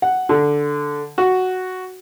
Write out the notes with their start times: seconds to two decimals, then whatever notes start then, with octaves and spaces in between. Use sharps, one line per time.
0.02 F#5
0.29 D3
1.18 F#4